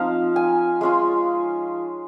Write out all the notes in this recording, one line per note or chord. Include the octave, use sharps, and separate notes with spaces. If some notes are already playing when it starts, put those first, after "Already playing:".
Already playing: F3 C4 D#4 F5
G#5
G#3 C#4 F4